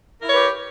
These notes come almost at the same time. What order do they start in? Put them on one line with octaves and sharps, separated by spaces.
A#4 E4 C#5 B4 G4